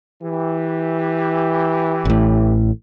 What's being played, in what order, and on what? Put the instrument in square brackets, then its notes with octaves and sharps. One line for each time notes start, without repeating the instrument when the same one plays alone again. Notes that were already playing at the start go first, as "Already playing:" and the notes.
[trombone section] E3 G4
[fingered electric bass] A1 A2